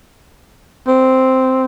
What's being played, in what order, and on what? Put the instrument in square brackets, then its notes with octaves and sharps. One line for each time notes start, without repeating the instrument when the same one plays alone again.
[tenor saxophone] C4